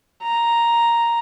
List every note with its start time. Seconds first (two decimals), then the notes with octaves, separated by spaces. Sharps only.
0.23 A#5